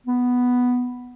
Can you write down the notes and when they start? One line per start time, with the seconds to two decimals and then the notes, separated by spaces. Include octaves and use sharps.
0.07 B3